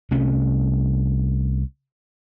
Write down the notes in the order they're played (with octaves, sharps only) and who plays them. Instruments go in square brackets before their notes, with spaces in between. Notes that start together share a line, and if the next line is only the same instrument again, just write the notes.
[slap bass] C2 C3 A3 C#4